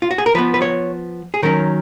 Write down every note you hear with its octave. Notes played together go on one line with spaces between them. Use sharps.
F4
F#4
G#4
A#4
F3 B3 B4
B4
C#5
G#4
D#3 F#3 C#4 A#4